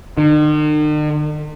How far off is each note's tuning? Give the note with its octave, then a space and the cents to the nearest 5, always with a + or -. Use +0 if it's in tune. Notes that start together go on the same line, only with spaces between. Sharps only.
D#3 -45